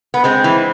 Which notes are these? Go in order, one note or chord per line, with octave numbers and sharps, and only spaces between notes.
B3
G#3 C4
E3